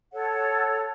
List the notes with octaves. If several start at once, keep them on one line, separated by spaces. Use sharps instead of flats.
A4 C#5 F#5